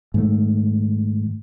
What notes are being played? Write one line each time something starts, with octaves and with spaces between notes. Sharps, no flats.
G#2 D#3 A3